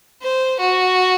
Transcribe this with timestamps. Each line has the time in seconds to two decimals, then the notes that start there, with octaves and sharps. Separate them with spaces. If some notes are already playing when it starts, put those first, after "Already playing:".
0.23 C5
0.60 F#4